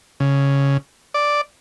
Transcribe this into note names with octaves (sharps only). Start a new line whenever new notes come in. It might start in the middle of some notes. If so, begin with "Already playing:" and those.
C#3
D5